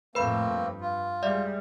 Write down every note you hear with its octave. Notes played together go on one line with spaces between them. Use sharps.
F2 A2 A3 A#3 C4 B4 B5
G2
F4
G3 G#3 D5 E5